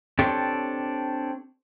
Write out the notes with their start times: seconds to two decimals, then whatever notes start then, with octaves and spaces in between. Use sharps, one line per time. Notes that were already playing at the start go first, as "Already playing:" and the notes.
0.19 C4 D4 G4 A4 C#5